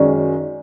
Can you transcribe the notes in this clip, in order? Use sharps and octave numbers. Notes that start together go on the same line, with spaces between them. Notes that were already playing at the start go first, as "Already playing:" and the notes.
Already playing: F#2 D#3 G#3 C#4 F#4 D5